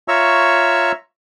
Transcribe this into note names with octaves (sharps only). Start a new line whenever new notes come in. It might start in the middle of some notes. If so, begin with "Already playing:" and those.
F4 C#5 E5 A#5 C#6 E6